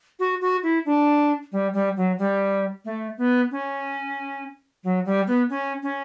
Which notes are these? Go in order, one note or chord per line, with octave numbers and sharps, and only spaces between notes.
F#4
F#4
E4
D4
G3
G3
F#3
G3
A3
B3
C#4
F#3
G3
B3
C#4
C#4